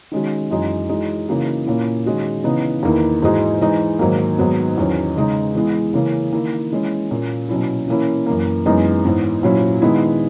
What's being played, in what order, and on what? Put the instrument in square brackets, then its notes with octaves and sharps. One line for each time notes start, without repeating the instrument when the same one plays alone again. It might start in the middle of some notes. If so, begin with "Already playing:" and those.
[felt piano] D#3 G#3 C#4 F#4
F#2 E3 G#3 D#4 F#4
E3 G#3 D#4 F#4
C#3 E3 A#3 D#4 F#4
A#2 A#3 C#4 E4
D#3 G#3 C#4 F#4
C#3 E3 B3 D#4
E2 D#3 A#3 E4
G#2 E3 G#3 D#4 F#4
E3 G#3 D#4
G#2 D#3 F#3 A#3
G#2 D#3 F#3 B3
E2 D#3 F#3 C#4
C#3 G#3 D#4
E3 G#3 B3 E4
C#3 E3 A#3 C#4
D#3 A#3 E4
E3 G#3 C#4 E4
A#2 A#3 C#4
B2 F#3 C#4 E4
E3 A#3 C#4 E4
F#2 E3 A#3
F#2 E3 G#3 B3 D#4
G#2 E3 B3
A#2 F#3 C#4 E4
D#3 G#3 B3 E4